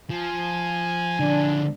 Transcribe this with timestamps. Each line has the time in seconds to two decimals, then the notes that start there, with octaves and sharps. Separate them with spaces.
0.10 F3 G#5
1.20 D3 F3 D4